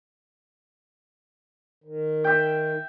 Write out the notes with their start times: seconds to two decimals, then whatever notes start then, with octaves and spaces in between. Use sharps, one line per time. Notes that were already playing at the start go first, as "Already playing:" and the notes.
1.84 D#3
2.24 E5 G5